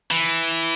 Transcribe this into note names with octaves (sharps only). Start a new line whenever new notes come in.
E3